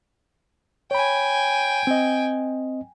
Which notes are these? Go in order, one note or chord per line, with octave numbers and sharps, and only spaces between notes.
C#5 G5 G#5 B5
C4 D#5